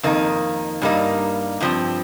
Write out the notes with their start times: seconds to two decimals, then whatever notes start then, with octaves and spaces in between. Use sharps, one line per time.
0.03 F2 D#3 A#3 D#4
0.82 G2 G3 A#3 D#4
1.61 G2 F3 C4